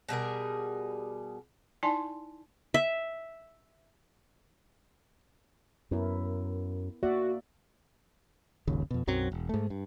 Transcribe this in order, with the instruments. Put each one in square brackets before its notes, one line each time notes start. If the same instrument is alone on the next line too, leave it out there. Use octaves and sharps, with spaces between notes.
[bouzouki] B2 G3 G#4 A#4
[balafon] D#4 E4 D5 G#5 A5 C6
[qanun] E5
[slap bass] F#2 [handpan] B3 E4 A#4
[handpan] A#3 D5 E5 [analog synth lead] F#4
[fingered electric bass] D#1 G#1 D#2 C#3
F2 B2
B1 F#2 F#3 C4
E1
G#2 A3
G2